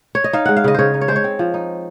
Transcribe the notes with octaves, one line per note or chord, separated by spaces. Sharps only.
C#5
D#5
D#4 F5
G#3 F#5
F5
C#3 D#5
C#3 C5 C#5
D#4
C#5
G#3 C5
C#5
C4
F3
D#4